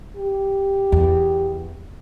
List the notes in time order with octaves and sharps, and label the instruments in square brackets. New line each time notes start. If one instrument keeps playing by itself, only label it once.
[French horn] G4
[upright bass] E2